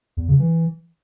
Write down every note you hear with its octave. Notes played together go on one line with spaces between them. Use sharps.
E2
C#3
E3